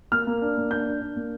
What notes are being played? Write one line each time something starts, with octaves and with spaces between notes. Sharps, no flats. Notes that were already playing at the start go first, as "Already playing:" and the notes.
A#3 F6
A#3
D4
A#3
D4 G6
D4
D4
A#3